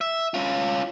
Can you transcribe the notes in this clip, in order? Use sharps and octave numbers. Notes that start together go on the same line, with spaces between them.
E5
C#4 F4